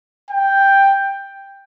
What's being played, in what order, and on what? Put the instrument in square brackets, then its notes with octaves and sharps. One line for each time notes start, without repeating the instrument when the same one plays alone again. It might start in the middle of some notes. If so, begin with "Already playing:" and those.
[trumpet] G5